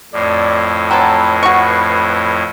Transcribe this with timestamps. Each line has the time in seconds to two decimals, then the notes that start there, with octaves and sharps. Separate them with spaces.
0.13 F2 A2 D5
0.91 F#3 C4 A4 B4
1.43 F#4 C#6